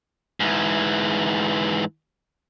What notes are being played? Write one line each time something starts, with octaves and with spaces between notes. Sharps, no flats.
G#2 E3